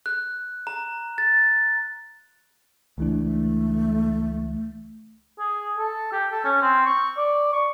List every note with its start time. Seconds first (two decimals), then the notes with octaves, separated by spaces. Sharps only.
0.06 F#6
0.67 A#5
1.18 A6
2.98 C#2 E3 A3 D4
5.39 G#4
5.77 A4
6.12 G4
6.31 A4
6.44 C#4
6.62 C4
6.86 C#6
7.17 D5
7.53 C#6